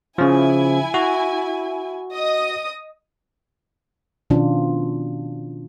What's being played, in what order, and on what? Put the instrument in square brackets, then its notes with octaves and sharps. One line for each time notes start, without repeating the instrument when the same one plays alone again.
[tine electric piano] C#3 F3 [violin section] E4 G#5
[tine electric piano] F#4
[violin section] D#5 D#6
[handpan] B2 D#3 F3 C#4 D4 F4